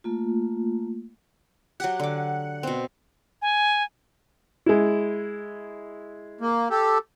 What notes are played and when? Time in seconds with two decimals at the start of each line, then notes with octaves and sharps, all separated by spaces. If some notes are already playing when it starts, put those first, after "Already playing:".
0.04 A3 A#3 F4
1.80 F#3 G4 F#5
2.00 D3 D6
2.63 B2 C4
3.42 G#5
4.66 G#3 E4
6.41 A#3
6.70 G4 A4